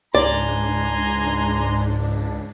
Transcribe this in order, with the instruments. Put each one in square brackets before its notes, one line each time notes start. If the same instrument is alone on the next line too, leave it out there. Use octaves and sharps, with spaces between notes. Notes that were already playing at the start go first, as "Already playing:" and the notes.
[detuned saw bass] C#2 [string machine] G#2 D4 [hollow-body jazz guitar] D5 [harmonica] G#5 A#5 C6